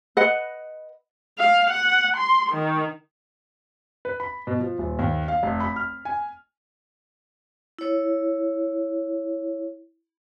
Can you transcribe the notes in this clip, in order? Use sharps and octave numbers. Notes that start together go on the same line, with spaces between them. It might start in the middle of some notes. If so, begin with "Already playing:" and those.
B4 D#5 F#5
F5
F#5
C6
D#3
B4
B5
B2
F3
D#1
D#2
F5
F1
B5
F6
G#5
E4 C#5